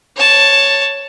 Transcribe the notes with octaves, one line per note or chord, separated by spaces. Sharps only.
C#5 A5